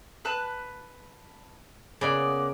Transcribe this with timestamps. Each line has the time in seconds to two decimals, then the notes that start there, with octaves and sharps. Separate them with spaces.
0.25 B4 A5 F#6
2.01 C#3 A#3 B3 D5